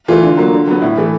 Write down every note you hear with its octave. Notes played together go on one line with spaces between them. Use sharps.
E3 A3 F4
D3
F#3 A#3
D3
F#3 B3
A2 E4
E3 A3